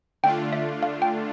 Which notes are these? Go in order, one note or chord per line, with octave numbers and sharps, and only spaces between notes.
D3 A3 D4 F4 G5
E5
F5
G5